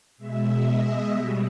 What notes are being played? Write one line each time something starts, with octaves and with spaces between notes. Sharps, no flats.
B2 G#3 E5
D#5
B2 G3